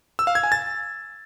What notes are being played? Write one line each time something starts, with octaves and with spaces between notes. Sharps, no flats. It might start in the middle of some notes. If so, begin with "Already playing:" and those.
E6
F5
G#6
G#5
A6